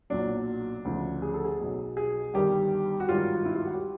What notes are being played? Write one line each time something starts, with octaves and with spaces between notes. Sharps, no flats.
B1 A#2 F#3 D4
D2 C#3 F3
G#4
A4
G#4
B1 B2 F#3
G#4
G1 G2 D#3 G3 G4
F#4
G#1 G2 D#3 F#3 F4
E4
F4
F#4
G4